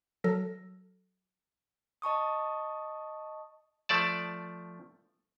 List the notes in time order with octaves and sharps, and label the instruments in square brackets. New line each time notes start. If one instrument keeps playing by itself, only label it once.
[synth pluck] F#3 A4 E6 F6 A#6
[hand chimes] D#5 A5 C#6 D#6
[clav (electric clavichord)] F3 A3 D5 A5